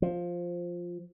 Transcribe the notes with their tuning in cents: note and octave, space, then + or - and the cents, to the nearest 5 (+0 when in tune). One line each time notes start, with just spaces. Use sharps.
F3 +5